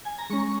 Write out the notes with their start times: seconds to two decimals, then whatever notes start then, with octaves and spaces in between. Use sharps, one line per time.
0.05 G#5
0.18 A#5
0.30 G#3 C#4 C#6